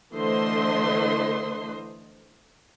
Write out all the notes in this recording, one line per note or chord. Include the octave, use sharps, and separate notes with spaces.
D3 E3 A3 C5 D#5 C6